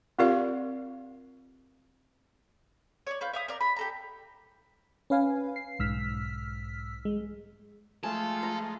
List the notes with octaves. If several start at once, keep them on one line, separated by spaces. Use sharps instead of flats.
C4 F4 G4 A#4 D5 F5
C#5 D5
F4 B4 G6
E5 F5 D#6
A#4 D5
B5
G4 A4 A#5
C#4 B4 F5 G#5
C7
B1 G#2 E6 F6 B6
G#3
F3 G#3 A3 F4 A4 G#5
A#5